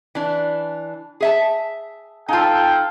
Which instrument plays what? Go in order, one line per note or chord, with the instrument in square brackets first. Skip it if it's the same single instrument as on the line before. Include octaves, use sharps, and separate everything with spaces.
[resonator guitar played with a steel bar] E3 D4
G#4 E5 A5
[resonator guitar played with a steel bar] D#4 F4 [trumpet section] A4 F5 G5